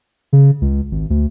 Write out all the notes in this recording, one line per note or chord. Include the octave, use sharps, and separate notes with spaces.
C#3
C#2
G#1
D2